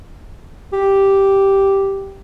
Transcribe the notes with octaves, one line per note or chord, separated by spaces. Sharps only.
G4